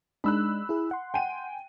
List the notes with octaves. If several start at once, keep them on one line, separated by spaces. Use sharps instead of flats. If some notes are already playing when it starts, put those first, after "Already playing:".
G#3 D4 D#4 B5 E6 F#6
E4 G#4
F#5 C6
G5 G#5 D#7